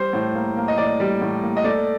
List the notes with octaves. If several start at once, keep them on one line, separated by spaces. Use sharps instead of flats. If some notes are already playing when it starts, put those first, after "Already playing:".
Already playing: G3 C5
A2
A#3
A#3
D#5
A2 D5
G3
A2
A#3
D#5
A3 D5